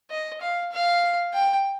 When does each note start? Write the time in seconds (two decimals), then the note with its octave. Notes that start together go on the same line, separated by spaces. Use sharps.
0.11 D#5
0.42 F5
0.72 F5
1.33 G5